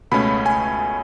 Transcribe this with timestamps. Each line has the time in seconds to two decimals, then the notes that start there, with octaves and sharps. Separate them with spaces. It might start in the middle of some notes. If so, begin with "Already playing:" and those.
0.11 C#2 B2 A3 C#4 B5
0.46 G#5